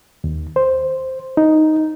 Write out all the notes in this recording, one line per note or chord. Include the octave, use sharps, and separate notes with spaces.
D#2
C5
D#4